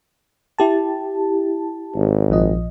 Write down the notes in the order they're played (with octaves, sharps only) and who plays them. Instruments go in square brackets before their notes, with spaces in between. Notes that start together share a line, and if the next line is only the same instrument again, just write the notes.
[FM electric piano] E4 G4 A5
[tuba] G#1
[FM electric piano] A#1 F3 D#5